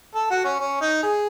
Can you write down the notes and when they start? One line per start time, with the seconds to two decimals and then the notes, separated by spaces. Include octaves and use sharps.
0.15 A4
0.30 F#4
0.45 C#4
0.60 C#4
0.81 D#4
1.03 G#4